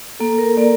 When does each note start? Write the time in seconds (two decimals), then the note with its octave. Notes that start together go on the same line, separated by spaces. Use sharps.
0.20 A#3 A4
0.39 A#4
0.57 A#3 D5